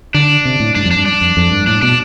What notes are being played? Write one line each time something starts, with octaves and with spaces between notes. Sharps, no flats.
D3 D4
C3
A2
G2 D4
F2
G2 D4
D4
F2
F2
G2
A2 D4
B2 D4